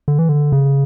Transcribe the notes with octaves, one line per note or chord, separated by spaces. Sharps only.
D3
E3
D3
C#3